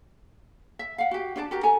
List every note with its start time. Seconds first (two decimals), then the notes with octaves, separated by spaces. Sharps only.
0.79 E5
0.98 F5 F#5
1.11 F#4 G4
1.36 D4 C#5 D5 A5
1.51 F#4 G4 A#4
1.63 A4 G#5 A#5